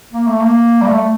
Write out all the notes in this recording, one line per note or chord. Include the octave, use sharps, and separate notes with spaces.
A#3
A3
A#3
G3
A3